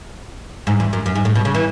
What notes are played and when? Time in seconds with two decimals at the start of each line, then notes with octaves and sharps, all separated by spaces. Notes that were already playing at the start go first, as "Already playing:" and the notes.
0.67 G#2
0.80 E2
0.93 F#2
1.06 F#2
1.15 G#2
1.25 A2
1.35 B2
1.45 C#3
1.55 E3